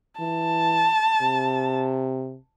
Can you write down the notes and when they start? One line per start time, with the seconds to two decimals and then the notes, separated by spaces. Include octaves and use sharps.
0.20 E3 A5
1.22 C3